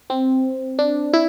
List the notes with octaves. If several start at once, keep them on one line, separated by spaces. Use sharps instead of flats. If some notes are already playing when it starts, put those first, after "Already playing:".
C4
D4
E4